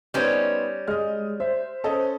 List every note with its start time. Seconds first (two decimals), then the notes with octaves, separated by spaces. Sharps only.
0.14 G3 B3 C#4 D#4 C5
0.88 G#3 D#5 F6
1.40 C5 E5
1.84 C#4 A4 D#5